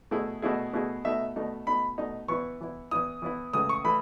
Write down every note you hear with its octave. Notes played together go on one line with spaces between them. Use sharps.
B2 A3 E4 G#4
B2 A3 E4 G#4
B2 A3 E4 G#4
B2 A3 D#4 E5
B2 A3 D#4
B2 A3 D#4 B5
B2 A3 D#4
E3 B3 E4 C#6
E3 B3 E4
E3 B3 E4 D#6
E3 B3 E4
C#2 C#3 E3 A3 D#6
C#6
E3 A3 B5